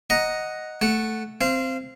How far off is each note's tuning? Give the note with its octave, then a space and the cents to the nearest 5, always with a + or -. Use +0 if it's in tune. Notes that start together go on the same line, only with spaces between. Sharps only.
D#5 +0 F#5 +0 A#5 +5
A3 +0 F#5 +0
C4 +0 F5 -25